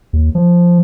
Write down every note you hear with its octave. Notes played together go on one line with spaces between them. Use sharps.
D#2
F3